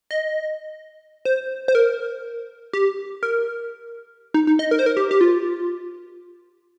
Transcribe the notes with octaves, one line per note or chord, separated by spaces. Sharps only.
D#5
C5
C5
A#4
G4
A#4
D#4
D#4
D#5
A#4
C5
A#4
G4
G4
F4